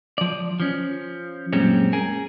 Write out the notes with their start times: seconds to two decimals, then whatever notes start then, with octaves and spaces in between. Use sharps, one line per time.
0.18 F3 D5
0.60 F3 C#4
1.53 F#2 A#2 G3 G#3 C4 C#4
1.93 G#4 A#4 G#5